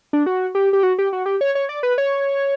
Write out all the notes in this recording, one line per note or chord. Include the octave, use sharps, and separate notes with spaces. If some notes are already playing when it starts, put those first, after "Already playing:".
D4
F#4
G4
G4
F#4
G4
F#4
G4
C#5
C#5
D5
B4
C#5